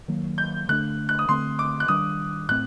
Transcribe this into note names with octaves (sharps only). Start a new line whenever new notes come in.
D#3 F#3 A#3
G6
D3 A3 D4 F#6
F#6
D#6
D3 A3 C4 C6
D6
F#6
D#3 G3 D4 D#6
A2 A3 C4 F#6